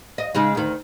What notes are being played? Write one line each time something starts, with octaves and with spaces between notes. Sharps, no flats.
D#5
C#3 G#3 D#4
D2 D#3